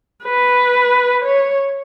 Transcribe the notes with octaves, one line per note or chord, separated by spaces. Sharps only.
B4
C#5